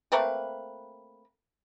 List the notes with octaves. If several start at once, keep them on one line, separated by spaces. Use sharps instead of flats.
A3 A#3 C4 B4